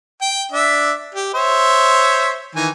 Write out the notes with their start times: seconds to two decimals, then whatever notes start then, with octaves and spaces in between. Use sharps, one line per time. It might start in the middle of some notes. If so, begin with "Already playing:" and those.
0.21 G5
0.52 D4 E5
1.15 G4
1.34 C5 C#5 E5
2.55 D#3 E3 G#5